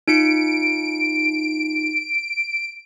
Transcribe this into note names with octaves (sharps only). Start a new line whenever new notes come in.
D#4 F4 C#7 D7